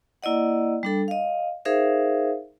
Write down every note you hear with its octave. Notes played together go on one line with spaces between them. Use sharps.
A#3 E4 D5 D#5 F#5
G3 D4 A4
D#5 F5
D#4 G#4 A#4 C5 E5 F5